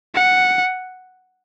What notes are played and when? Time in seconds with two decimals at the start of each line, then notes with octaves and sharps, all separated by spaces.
0.14 F#5